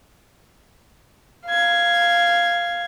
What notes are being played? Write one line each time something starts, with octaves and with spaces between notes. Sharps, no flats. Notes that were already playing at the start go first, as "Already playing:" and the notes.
F5 G#6